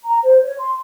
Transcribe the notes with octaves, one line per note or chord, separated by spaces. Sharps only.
A#5
C5
C#5
C6